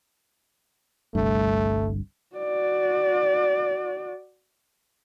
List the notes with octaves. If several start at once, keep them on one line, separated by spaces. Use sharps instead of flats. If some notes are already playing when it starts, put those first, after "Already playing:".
G1 C2 G2 A3
F#4 D5